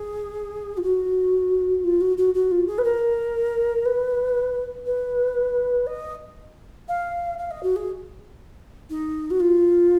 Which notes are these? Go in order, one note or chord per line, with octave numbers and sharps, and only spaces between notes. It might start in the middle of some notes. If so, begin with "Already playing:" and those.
Already playing: G#4
F4
F#4
F4
F#4
F#4
F#4
F4
G#4
B4
A#4
B4
B4
D#5
F5
F5
D#5
F#4
G#4
D#4
F#4
F4